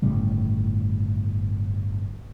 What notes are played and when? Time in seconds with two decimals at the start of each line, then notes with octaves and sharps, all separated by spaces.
0.02 G1 A2 C#3 G3